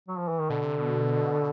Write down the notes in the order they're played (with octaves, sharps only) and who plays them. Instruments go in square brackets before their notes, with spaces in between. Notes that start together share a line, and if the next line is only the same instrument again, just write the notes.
[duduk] F#3
F3
E3
D#3
[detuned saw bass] B2 [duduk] D3
[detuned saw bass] C3
B2